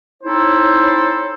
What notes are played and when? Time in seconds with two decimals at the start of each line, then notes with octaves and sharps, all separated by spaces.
0.23 C4 D#4 E4 A4 C5 C#5